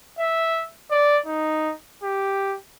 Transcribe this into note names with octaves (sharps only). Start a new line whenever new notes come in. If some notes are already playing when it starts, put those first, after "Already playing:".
E5
D5
D#4
G4